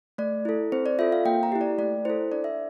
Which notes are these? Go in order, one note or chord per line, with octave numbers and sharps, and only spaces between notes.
A3 D5
E4 A4
C4 C5
D5
F4 A4 E5
F5
A#3 G5
A#5
E4 G4
D5
A3 D5
E4 A4 C5
D4 D5
E5